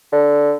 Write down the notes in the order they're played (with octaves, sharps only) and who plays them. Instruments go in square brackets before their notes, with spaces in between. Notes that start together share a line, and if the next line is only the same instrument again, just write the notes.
[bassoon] D3